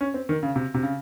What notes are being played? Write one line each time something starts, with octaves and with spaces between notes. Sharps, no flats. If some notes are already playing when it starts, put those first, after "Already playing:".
C#4
C4
D#3
C#3
C3
C3
C#3